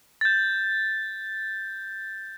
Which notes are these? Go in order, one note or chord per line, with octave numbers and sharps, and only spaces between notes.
G6 A6